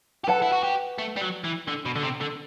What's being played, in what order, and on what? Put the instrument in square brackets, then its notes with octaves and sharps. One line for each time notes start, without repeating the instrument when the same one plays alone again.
[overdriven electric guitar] G4
[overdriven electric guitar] A4 [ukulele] B4 F#5 A5
[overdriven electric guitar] E4
F#4
G4
A3
G3
F#3
E3
D3
B2
D3
C3
D3